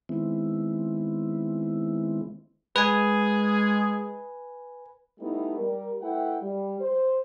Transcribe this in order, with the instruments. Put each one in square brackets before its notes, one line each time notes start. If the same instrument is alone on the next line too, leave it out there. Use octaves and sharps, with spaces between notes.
[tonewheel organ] D#3 G#3 B3 C4 E4
[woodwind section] G#3 G#4 [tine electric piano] B4 G#5
[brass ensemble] G3 A3 B3 D#4 E4 G4
G3 A#4
A3 E4 B4 F#5 G5
G3
C5